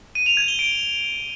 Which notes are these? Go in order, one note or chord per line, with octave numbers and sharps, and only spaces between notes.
D#7
F7
G#6
G7
D7